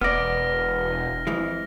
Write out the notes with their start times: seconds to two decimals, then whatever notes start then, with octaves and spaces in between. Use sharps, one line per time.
0.01 E1 B3 D5 F6 A#6
1.27 F2 E3 G#3